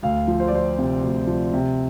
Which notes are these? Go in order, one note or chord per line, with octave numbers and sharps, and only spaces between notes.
D2 F5
F3
C5
D5
F3 C5
C3
D2
F3
C3